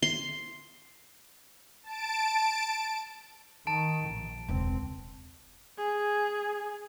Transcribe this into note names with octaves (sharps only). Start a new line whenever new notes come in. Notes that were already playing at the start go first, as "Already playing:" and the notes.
C6
A5 D7
D#3 A5 D7
A#1
E1 C#2 C4
G#4